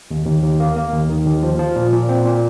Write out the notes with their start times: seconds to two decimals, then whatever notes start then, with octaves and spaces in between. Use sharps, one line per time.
0.11 D#2
0.26 D#2
0.43 D#2
0.60 A#3
0.76 A#3
0.93 D#2
1.09 D#3
1.26 D#2
1.43 F3
1.59 F3
1.76 A#2
1.92 A#2
2.09 C4
2.25 A#2